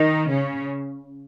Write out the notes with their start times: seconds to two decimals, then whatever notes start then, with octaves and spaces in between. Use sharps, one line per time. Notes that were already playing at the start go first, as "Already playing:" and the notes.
Already playing: D#3 D#4
0.30 C#3 C#4